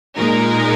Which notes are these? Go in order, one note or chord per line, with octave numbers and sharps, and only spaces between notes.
A#2 G#3 D#4 A#4